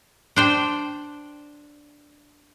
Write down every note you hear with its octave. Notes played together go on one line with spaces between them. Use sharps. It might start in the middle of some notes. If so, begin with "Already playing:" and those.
D4 C5 G5